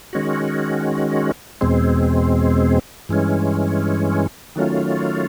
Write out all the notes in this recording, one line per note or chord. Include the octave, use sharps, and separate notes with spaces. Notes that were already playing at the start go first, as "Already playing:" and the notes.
D#3 G#3 C#4 F#4
E2 B2 G#3 C4
G2 E3 G#3 C#4
D#3 F#3 A3 C#4 F4